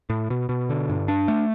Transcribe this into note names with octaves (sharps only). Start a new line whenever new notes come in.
A2
B2
B2
D3
G2
D4
A3